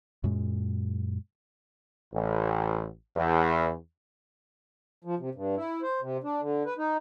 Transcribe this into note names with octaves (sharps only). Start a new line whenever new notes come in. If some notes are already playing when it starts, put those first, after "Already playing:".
F#2 A#2 G#3
A1
E2
F3
C3
G2
E4
C5
C3
D4
D3
B4
D#4